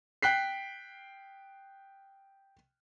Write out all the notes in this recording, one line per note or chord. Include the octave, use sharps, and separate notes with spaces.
G5 F#6 B6 C7